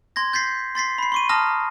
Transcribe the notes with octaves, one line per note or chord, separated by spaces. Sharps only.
C6 G#6 A#6
G6 A6 B6 C7
C6 A6 B6 C7
B5 C7
C6 C#6 D#7
A5 A#5 D#6 F6 A#6